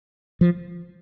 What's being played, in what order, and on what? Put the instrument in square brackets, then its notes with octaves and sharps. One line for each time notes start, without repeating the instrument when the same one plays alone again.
[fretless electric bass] F3